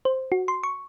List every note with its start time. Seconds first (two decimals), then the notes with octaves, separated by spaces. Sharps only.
0.05 C5
0.32 F#4
0.48 C6
0.63 C#6